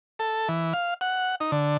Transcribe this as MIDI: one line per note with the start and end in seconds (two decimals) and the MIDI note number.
0.19 0.48 69
0.49 0.73 52
0.73 0.94 77
1.01 1.35 78
1.40 1.51 63
1.52 1.77 50